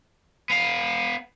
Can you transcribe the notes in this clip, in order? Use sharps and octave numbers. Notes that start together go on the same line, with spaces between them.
B3 F5